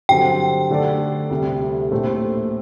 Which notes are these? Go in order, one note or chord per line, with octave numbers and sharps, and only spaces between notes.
G2 D3 F#3 C4 G4 G5
D3 A3 D4 A4 D5
D2 C3 G3
A#1 A2 A3 C4